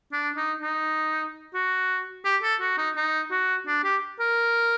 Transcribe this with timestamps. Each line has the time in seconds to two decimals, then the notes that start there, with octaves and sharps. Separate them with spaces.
0.13 D4
0.37 D#4
0.60 D#4
1.54 F#4
2.25 G4
2.43 A4
2.60 F#4
2.78 D#4
2.96 D#4
3.31 F#4
3.67 D4
3.84 G4
4.19 A#4